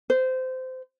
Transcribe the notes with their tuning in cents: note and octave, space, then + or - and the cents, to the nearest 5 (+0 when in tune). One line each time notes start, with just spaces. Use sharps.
C5 -20